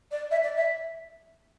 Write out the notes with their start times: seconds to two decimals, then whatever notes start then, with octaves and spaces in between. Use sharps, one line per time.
0.11 D5
0.30 E5
0.43 D5
0.56 E5